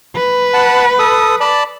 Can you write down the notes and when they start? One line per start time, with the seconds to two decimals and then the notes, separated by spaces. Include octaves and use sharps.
0.16 B4
0.54 F#5 A5
0.99 A4 D#6
1.41 D5 A5 B5